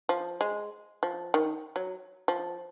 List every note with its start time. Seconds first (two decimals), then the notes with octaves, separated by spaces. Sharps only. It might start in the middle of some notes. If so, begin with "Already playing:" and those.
0.09 F3
0.41 G#3
1.03 F3
1.34 D#3
1.76 F#3
2.28 F3